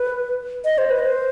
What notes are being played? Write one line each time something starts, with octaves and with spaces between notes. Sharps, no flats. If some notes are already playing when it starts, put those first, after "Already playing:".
Already playing: B4
D#5
C5
B4
C5